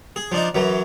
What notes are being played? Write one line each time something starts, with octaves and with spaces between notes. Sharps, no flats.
G#4
F3 D4 D#4
F#2 E3 F#3